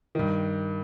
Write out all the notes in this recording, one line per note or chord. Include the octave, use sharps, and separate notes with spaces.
G2 D#3